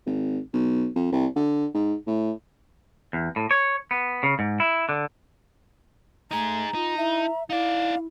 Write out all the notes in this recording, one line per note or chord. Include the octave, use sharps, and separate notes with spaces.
G#1
B1
F2
C2
D3
G#2
A2
E2
A2
C#5
B3
C#3
G#2
E4
D3
A3 D#4 G#4 A#5
D#4 F4
E4 E5
D#4 E4 D5 F5